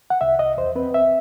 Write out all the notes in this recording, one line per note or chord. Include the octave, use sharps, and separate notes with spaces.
F#5
C2 E5
C2 D#5
E2 C5
C4 B4
C2 E5